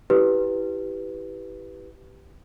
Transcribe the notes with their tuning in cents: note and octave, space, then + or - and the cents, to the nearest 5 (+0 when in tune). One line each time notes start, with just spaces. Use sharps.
E4 +0 G4 -10 B4 +0